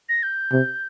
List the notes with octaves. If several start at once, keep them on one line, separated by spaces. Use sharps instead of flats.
A#6
G6
C3